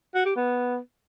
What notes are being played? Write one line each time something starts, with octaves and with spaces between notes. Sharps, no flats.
F#4
G4
B3